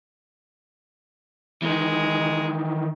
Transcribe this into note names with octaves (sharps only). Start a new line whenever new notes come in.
D#3 E3 G#3